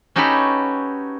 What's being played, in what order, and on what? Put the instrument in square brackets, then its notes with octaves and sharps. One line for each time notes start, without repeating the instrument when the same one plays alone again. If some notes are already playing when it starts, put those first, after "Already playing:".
[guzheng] C#4 D#4 F#4 G4 A4 B4